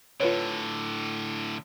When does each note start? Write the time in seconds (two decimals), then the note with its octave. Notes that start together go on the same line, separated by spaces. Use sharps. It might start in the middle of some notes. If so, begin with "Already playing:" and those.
0.20 A2 D3 F4 B4 C#5